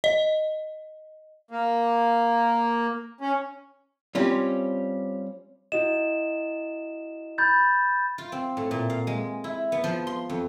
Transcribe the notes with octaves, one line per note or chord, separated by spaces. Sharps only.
D#5
A#3
C#4
G3 C4 C#4 F4
E4 F#4 D#5 E7
B5 G6 A6
F4
C4
A2
A#2
F5
G#3
E4
B3
F3
C6
F2